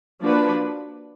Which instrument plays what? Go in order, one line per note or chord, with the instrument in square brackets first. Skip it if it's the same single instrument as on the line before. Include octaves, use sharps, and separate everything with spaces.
[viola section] F3 A#3 D4 F#4 B4